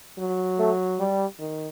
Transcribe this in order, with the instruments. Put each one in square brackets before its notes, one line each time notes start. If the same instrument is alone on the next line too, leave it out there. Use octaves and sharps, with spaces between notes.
[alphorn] F#3
[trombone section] A3
G3
[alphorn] D#3